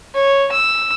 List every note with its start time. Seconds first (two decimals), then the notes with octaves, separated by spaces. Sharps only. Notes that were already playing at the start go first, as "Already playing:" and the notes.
0.15 C#5
0.52 E6